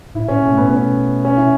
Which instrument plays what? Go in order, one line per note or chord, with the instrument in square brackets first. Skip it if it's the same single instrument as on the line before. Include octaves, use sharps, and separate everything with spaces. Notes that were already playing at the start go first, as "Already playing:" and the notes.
[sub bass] A2 [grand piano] E4
[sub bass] A2 [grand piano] C#4
[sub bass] B2 [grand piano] A3
[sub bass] A2 [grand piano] B3
[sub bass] B2 [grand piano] C#4
[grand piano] C#4
E4